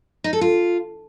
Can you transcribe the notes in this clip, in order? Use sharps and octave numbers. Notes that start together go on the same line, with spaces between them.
D#4
A4
F4